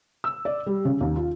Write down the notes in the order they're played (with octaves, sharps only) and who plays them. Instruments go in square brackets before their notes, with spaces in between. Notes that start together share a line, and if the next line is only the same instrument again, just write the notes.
[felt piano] E6
D5
G3
C#3
D#2
F4